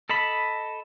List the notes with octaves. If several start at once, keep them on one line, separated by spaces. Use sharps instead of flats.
A4 D#5 A5 B5